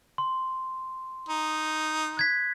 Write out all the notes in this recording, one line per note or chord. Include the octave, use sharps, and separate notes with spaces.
C6
D#4
F#6 G#6 B6